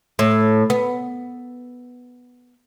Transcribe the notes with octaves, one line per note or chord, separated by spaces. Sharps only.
A2
B3